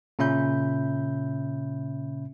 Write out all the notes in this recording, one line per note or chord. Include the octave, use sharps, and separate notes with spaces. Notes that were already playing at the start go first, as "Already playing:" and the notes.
A#2 C#3 C#4 E5 B5 G6